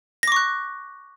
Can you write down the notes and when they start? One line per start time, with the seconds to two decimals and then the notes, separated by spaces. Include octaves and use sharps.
0.23 A#6
0.28 D6
0.32 C#6
0.36 F#6